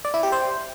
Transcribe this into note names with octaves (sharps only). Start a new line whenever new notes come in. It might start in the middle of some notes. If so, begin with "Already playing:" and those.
D5
E4
G4
C5